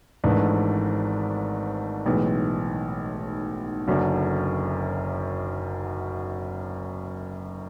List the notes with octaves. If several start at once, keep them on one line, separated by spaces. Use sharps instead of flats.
G#1 G#2 E3 A3 D4
B1 A2 E3 G#3
F#1 F#2 D3